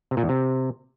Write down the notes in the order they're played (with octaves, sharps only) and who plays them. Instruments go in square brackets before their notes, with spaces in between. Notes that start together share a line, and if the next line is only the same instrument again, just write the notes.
[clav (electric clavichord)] C3
A#2
E2
C3